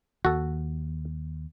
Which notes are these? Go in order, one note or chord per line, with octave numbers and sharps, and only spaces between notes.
D#2 F#4 A4